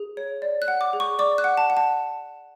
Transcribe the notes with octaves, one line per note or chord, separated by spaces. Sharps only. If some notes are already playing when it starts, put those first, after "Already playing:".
Already playing: G#4
C#5
D5
F#6
F#5
D6
G#4
C#6
D5 D6
F#6
F#5
A5
F#5
A5